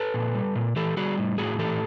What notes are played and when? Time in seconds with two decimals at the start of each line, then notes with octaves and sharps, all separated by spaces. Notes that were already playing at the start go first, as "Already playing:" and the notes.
Already playing: A4 B4
0.14 A#2
0.35 G3
0.56 A#2
0.76 E3 G4 A4
0.97 G3 F#4 G#4
1.17 A2
1.38 A2 F#4 G#4
1.59 E3 G4 A4